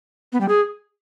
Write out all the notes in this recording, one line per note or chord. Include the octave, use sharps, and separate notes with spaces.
B3
G3
G#4